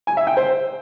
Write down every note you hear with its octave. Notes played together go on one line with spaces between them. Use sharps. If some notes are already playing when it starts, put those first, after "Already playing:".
G#5
E5
G5
C5